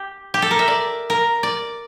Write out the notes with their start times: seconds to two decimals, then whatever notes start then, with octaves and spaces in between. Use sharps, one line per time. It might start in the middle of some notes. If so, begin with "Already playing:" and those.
Already playing: G4
0.34 G4
0.42 A4
0.51 A#4
0.59 E5
0.68 D5
1.10 A#4
1.43 D5